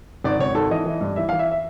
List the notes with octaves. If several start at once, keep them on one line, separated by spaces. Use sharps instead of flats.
G#1 D5
G#1 C#5
G#1 A4
E3 D#5
E3
G2
E3 E5
F5
E3
E5
E5